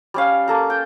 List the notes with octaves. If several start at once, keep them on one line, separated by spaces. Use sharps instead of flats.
G3 C#4 F5
A#3 A4 A#5
G5